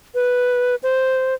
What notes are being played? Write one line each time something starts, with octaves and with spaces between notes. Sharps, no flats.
B4
C5